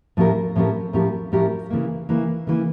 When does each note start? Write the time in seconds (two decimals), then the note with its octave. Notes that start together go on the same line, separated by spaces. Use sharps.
0.17 A2 F3 C#4 G4 A#4
0.56 A2 F3 C#4 G4 A#4
0.93 A2 F3 C#4 G4 A#4
1.32 A2 F3 C#4 G4 A#4
1.70 C#3 E3 A#3
2.09 C#3 E3 A#3
2.47 C#3 E3 A#3